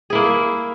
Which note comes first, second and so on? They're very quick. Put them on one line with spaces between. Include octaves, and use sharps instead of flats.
G#4 E4 A#3